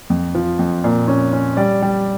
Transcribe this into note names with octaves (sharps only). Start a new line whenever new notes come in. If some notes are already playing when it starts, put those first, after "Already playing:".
F2
F3
F2
A#2
C#4
C#4
G3 D5
G3